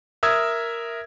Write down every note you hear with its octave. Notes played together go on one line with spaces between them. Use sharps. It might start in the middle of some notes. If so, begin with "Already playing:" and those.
A#4 E5 D#6 E6 G#6